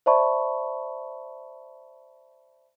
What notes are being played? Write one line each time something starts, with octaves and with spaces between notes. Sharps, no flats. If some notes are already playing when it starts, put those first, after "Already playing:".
C5 D5 E5 A5 B5 C#6